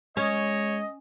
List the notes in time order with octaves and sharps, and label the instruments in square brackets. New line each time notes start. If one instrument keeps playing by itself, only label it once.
[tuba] G#3 [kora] C#4 [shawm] C#5 [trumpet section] D#5